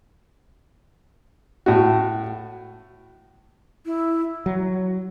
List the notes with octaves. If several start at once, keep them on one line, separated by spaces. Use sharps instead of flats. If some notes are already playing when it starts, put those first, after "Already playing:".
A2 F#4
E4
F#3